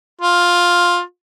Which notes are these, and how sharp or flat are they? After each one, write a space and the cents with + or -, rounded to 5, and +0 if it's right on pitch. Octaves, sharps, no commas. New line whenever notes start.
F4 +10